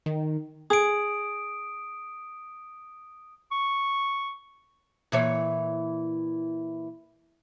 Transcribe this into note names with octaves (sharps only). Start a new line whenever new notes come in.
D#3
G#4 D#6 D7
C#6
A#2 E3 C#5